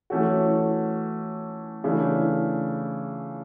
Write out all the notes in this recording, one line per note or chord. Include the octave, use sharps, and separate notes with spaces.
E3 A3 C#4 F#4
C#3 E3 A3 D4